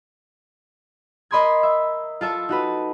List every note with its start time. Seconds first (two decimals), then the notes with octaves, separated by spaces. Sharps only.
1.31 A#4 D#5 B5 C6 D#6 G#6
1.63 E5
2.21 F4 A4 E5 A5
2.49 D#4 F#4 B4